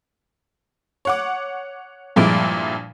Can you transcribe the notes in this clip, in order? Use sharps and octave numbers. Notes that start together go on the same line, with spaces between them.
C#5 F#5 D6
G2 A#2 F3 G#3 E4 D7